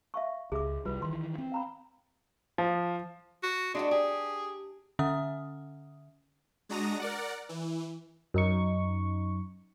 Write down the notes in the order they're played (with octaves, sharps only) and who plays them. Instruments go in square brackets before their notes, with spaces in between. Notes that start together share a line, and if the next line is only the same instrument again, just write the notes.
[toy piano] E5 F5 C#6
[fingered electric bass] C#2 [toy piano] G#4 E5 D6
[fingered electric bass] C2 G3 [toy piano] F4 B4
[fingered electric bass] D#3 E3 [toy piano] C6
[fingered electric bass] C4
[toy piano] F5 A#5 B5
[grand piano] F3
[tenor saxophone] F#4
[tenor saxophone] G#3 [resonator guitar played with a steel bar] D4 E4 F#4
[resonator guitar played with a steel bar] G4 [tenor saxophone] G#4
[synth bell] D3 C#4 E5 D#6
[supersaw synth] G#3 D4 F#4 A#5 D#6 A#6
A#4 D5 F#5
E3
[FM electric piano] F#2 D#4 C#6